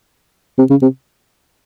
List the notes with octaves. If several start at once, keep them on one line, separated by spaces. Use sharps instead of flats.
C3
C#3
C3